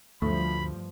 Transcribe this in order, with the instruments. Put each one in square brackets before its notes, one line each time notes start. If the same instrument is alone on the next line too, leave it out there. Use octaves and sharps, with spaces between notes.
[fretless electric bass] D2 [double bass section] G2 F3 [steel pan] A3 [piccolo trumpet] B5